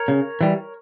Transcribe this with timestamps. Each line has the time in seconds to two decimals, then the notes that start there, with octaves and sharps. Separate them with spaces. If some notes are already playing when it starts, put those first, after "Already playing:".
Already playing: A#4 C#5
0.08 C#3
0.41 E3 G3